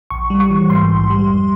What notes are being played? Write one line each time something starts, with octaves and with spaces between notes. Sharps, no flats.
A#1 C#6
G3
C#6
E3
G#2 C6
A#1
G3
F2